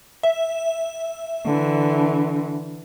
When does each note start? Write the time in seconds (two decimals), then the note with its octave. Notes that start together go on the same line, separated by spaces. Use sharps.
0.23 E5
1.45 D3 E3